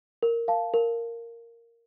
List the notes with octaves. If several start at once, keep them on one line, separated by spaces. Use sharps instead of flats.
A#4
F5 A5
A#4